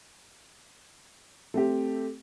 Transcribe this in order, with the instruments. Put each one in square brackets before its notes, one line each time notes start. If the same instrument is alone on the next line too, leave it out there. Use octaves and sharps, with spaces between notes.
[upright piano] A3 C4 G4